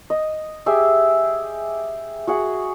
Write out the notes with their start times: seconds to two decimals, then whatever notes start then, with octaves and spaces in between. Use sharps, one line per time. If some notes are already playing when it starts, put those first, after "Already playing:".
0.10 D#5
0.66 G4 G#4 E5
2.27 F#4 G#4 F#5